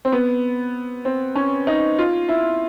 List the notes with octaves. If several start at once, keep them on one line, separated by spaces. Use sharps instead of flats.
C4
B3
C4
C#4
D#4
F4
E4